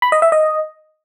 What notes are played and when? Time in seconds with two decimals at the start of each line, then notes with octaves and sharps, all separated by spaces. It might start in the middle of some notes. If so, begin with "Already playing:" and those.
0.02 B5
0.12 D#5
0.22 E5
0.32 D#5